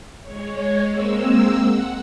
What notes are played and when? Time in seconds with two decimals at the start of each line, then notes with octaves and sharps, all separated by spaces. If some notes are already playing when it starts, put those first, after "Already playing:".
0.23 G#3 C#5
0.90 G#3 A#3 C4 E6
1.64 F#5